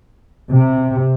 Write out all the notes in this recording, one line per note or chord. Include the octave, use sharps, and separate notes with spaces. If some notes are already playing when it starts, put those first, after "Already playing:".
C3